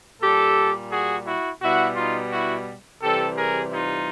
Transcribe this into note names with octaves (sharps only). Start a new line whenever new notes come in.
A#2 G3 G4 A4
F#4 G#4
E4 F#4
B2 G3 E4 F#4
D#4 F4
E4 F#4
C3 E3 G3 G4 A4
G#4 A#4
D#4 F4